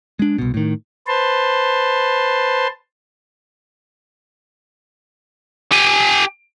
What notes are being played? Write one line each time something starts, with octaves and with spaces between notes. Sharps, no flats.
G#3 D4
C2 B2
A2 D#3
B4 C5 A5 C6
G4 G#5